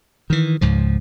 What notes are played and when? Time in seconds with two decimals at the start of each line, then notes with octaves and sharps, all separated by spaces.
0.30 D#3 E3
0.61 C#2 G#2 F3